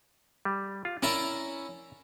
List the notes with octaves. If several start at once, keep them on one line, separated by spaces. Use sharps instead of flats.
G3
F4
C#4 E4 A#4 D5 A#5